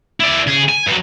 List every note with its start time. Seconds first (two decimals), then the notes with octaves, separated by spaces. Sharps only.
0.20 E4 D5
0.47 C#3 G#4
0.69 G#5
0.87 G2 F#3